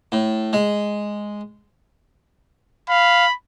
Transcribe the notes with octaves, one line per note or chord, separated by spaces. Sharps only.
A2
G#3
F5 B5